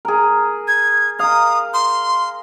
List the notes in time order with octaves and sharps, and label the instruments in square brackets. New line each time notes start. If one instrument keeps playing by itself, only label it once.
[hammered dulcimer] G#4 A#4
[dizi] G#6
[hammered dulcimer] A#4 F5 [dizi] D#6
[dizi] C6